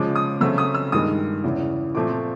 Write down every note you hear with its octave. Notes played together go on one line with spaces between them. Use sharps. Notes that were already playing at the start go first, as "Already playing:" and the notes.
Already playing: C#3 F3 G#3 D6
D#6
C#3 F#3 A3 C4 E6
D#6
E6
G2 D#3 G#3 D#6
E2 C#3 E3
A#2 F3 A3 C4 D6